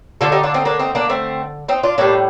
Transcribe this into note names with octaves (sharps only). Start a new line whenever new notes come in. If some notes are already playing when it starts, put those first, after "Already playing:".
D3 A3 F4 A4
D#4 G4
D4 F4
C4 D#4
A#3 D4
C4 D#4
A#3 D4
A3 C4
C4 D#4
D4 F4
A2 G3 A#3 D4